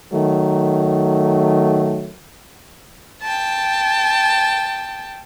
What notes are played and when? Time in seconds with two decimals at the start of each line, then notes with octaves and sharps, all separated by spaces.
0.12 D#3 F#3 A3
3.22 G5 A5